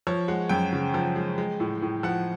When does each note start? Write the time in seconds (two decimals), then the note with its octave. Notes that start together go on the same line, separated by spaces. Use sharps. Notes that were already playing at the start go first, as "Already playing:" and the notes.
0.07 F3 C#5
0.28 G#3 F#5
0.49 F#2 G5
0.73 C#3
0.94 F3
1.16 G#3
1.38 G#3
1.60 A2
1.82 A2
2.03 F3 F#5